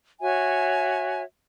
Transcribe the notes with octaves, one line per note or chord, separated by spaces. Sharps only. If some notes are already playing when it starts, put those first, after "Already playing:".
F#4 C#5 E5 G#5